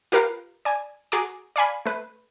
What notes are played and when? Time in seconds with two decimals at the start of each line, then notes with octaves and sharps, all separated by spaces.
0.12 F4 G4 A#4 B4 F5
0.65 D5 G#5
1.12 F#4 G#4 G#5 A#5 D6
1.56 D5 F5 G#5 B5
1.86 A3 B4